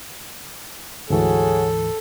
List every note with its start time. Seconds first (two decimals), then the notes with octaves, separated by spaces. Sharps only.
1.10 D2 G#2 E3 F#3 F#4 G#4 A4